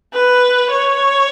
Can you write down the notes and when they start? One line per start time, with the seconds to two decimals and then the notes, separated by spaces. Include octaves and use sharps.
0.14 B4
0.72 C#5